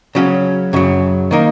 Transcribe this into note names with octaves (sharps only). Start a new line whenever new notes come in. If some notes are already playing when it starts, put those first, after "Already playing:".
C#3 F#3 C#4
F#2 C#3 F#3
D#3 A#3 D#4